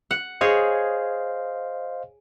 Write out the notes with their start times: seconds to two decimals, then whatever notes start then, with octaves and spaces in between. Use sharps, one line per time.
0.11 F#5
0.41 G#4 C5 C#5 D#5 F5